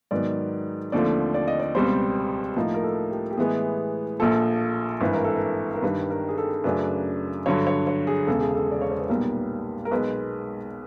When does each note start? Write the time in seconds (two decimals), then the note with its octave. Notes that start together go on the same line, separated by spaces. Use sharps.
0.11 G#2 D#3 F#3 B3 D5
0.92 D#2 D3 F3 A3 C4 D5
1.34 D5
1.48 D#5
1.60 D5
1.75 C#2 B2 G3 C4 C5
2.56 A2 F3 A#3 D#4 A#4
2.74 A#4
2.83 A4
3.11 G4
3.31 G4
3.37 A2 E3 G#3 B3 G#4
4.20 A#1 A#2 F3 A4
5.01 G#1 G2 E3 B4
5.13 A#4
5.24 A4
5.36 A#4
5.74 A#4
5.82 G2 D#3 G3 B4
6.10 A#4
6.29 G#4
6.38 A4
6.64 F#2 C#3 F#3 A3 D4 B4
7.46 G2 D3 F#3 C#5
7.67 C#5
7.87 C#5
8.07 G#4
8.27 E1 E2 C#3 A4
8.41 G#4
8.55 A4
8.72 D5
8.81 C#5
8.90 C5
9.00 B4
9.09 B1 A#2 G3 B3 A#4
9.85 A#4
9.91 B1 B2 G#3 B4